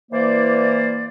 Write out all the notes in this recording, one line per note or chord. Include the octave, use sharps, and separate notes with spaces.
E3 A#3 C5 D5